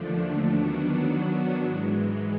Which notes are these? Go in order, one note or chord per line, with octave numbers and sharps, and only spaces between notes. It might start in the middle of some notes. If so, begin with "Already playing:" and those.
Already playing: D#2 D3 F3 A3 D4
D#3 F#3 B3 D4 F#4
G#2 E3 G#3